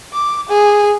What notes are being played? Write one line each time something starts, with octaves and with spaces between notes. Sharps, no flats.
D6
G#4